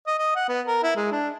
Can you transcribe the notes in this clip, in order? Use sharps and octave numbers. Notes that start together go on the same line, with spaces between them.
D#5
D#5
F#5
B3
A#4
E4
G#3
D4